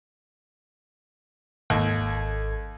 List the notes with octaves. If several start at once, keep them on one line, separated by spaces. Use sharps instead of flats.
G#1 D#2 A4 G#6